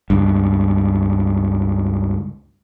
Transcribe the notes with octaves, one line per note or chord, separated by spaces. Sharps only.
C#2 G2